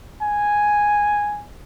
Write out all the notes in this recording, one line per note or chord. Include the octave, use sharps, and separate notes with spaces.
G#5